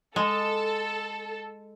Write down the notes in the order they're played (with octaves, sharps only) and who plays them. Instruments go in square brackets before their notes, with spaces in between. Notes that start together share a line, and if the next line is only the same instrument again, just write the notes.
[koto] G#3 [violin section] A4